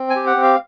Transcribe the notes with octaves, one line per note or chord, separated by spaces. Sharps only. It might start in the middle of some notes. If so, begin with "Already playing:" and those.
Already playing: C4
G#5
G4
F#5
C4
F5